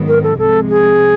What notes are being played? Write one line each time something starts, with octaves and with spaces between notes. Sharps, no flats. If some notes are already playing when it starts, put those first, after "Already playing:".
Already playing: G#1 G#2 D#3 F#3 B3
A#4
A4
C2 C3 F3 G#3 A4
G#4